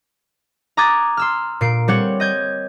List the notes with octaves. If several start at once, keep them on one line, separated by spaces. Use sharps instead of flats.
A#5 D6 D#6 F#6 G#6 A6
C6 E6 F6
A#2 C7 D7
G3 C4 G4 C#5 F#5
D#5 G6 G#6